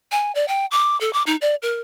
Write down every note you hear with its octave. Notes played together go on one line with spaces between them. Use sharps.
G#5
D5
G5
D6
A4
D6
D#4
D5
A#4